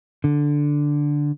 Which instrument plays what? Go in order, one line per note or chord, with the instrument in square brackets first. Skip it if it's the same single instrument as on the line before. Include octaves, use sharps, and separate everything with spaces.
[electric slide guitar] D3